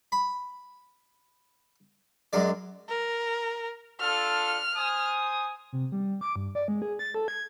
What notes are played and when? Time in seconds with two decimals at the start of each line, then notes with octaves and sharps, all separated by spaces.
0.12 B5
2.33 F#2 G#3 D5
2.89 A#4
4.00 D4 F4 A4 F6
4.77 C5 G#5 D#6
5.73 C3
5.92 G3
6.21 D6
6.36 G2
6.55 D5
6.68 G#3
6.82 G#4
6.99 A6
7.15 A4
7.28 G#6